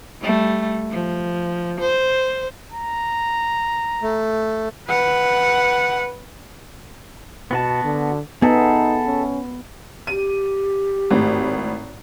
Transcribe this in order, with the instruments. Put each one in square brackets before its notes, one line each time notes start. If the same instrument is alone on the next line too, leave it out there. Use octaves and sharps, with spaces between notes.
[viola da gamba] G3 A3
F3
C5
[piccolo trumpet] A#5
[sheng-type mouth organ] A3
[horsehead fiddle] B4 F#5
[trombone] B2 [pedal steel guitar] B3 F#4 A5
[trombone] D3
[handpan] B3 [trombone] D#4 [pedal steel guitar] G#4 A4 E5
[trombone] C#4
[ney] G4 [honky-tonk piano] D#7
[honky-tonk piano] G#1 A2